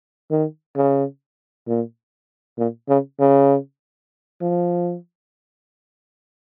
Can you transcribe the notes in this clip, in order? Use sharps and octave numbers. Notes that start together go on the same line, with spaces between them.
D#3
C#3
A#2
A#2
C#3
C#3
F3